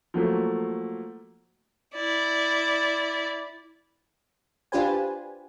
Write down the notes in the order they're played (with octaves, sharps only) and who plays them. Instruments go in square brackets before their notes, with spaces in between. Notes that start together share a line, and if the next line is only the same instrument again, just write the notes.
[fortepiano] F3 F#3 A3 A#3
[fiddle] E4 D5
[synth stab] D4 F4 G4 B4 C5 G#5